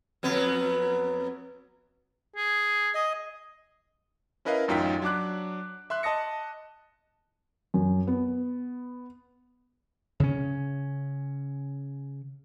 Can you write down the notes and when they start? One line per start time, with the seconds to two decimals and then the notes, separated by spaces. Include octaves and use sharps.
0.23 F2 F#3 B3
2.36 G#4
2.95 D#5
4.45 C#4 E4 A#4 B4 D#5 F5
4.68 A1 F#2 D#4 F4 G5 B6
5.02 F#3 D4 D6 F#6
5.90 E5 C6 F#6
6.03 D#5 A5 D#6 A#6 C#7
7.74 F#2
8.07 B3
10.20 C#3 C#4